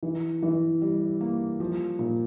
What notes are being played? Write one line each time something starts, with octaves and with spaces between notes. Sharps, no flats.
E3
E3
G3
A#3
F3
A#2